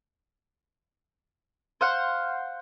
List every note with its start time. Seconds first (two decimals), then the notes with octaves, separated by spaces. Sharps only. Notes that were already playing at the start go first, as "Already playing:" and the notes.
1.81 C5 F5 F#5